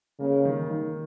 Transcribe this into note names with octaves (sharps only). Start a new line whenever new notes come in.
C#3 A#3
D#3
D#3